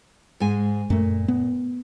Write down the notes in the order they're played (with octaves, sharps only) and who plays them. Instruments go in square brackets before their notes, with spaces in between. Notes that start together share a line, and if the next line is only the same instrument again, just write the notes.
[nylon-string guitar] G#2 G#3 G#5
[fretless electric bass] F#2 A3 [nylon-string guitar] A#2
[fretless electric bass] B3